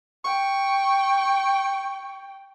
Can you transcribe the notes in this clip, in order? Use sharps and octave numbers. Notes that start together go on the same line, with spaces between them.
G5 C#6